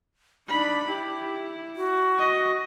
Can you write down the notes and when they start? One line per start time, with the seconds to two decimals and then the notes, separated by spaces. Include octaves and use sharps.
0.48 D4 D#4 B5
0.87 E4 G4
1.76 F#4
2.19 D#5